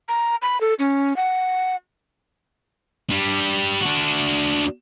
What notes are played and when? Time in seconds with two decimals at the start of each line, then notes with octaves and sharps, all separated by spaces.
0.08 A#5
0.42 B5
0.61 A4
0.79 C#4
1.16 F#5
3.10 G3 D4
3.81 D4 F#4